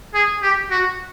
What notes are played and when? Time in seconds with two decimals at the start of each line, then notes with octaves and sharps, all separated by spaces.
0.14 G#4
0.43 G4
0.71 F#4